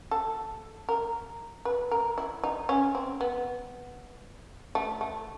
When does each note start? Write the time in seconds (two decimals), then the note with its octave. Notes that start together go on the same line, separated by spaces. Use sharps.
0.11 A4
0.89 A#4
1.65 B4
1.91 A#4
2.18 E4
2.44 D#4
2.69 C#4
2.95 C4
3.21 B3
4.75 A3
5.01 A3